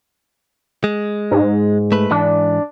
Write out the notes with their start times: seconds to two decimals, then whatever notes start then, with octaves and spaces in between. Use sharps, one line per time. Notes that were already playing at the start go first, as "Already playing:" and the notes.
0.84 G#3
1.31 G#2
1.92 A3 B4
2.11 G#2 E3 D4